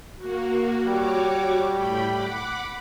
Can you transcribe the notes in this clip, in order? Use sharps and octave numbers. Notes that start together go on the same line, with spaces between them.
A#3 F#4
G3 F#4 C#5 D6
A2 G5 B5
F#5 B5 D6